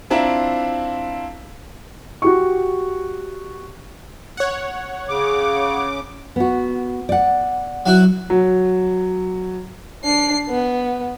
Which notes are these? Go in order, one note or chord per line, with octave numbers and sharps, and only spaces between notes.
C4 D4 E4 F4 A#5
F#4 G4 C#6
C#5 F#5
C#3 D6
B3 F#4
D5 F#5
F#3 E4 F#4
F#3
D4 C7
B3